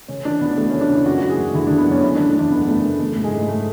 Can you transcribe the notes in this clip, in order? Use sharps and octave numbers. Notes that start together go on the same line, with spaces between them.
C#3 C#4
E3 D4
D2 B3
D2 A3
C#4
D2
D4
C#3 E4
F#1 F#4
F#4
F#1
G#4
F#1
D3 E4
D4
D3
B3
F#2 C#4
F#1 E4
D4
D3
A3
E2 D4
E2 B3
F#1 A3
F#1 B3
E3 A3
A3
G#2
G#3
G#2 A3
A3